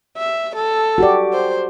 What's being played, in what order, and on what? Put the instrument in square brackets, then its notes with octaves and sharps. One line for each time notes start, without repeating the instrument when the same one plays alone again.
[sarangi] E5
A4
[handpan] F#4 G4 D5
[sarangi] C5